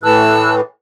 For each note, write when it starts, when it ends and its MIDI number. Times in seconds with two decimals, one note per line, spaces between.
0.03 0.61 45
0.03 0.61 52
0.03 0.54 81
0.03 0.54 88
0.03 0.54 90